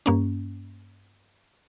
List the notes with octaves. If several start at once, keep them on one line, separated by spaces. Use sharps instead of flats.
G2 A#3 C#4